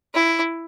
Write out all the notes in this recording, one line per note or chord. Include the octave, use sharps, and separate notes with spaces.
E4